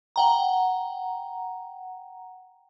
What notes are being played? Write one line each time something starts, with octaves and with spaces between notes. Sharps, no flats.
F#5 G5 A#5